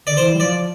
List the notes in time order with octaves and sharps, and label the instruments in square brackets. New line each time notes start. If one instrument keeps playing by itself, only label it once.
[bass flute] D3 [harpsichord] D5
[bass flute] E3 [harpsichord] C5
[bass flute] G3
[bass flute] F3 [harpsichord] D5